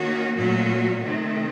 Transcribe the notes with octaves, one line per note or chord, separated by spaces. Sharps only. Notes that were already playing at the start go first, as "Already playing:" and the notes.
Already playing: D#3 A#3 C#4 F#4
A#2 F#3 A3 C#4 F#4
C3 D#3 A3